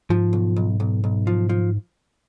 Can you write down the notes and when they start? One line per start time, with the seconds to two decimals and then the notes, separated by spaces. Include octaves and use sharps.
0.10 G#2 F3
0.33 B1
0.56 B1
0.80 B1
1.04 B1
1.27 F3
1.49 F3